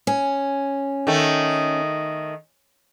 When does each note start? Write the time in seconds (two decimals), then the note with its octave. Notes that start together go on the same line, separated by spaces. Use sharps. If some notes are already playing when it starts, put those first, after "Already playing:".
0.07 C#4
1.07 D#3 A3